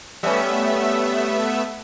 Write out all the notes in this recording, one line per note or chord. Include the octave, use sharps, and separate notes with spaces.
G3 A3 B3 C#4 E5